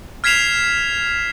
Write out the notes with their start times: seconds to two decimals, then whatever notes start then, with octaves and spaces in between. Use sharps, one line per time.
0.24 F6 G#6 B6 C7 E7 F7